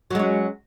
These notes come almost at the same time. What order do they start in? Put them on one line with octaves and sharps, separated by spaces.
F#3 G#3 C#4